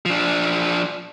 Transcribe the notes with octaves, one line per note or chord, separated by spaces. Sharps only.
F3 D4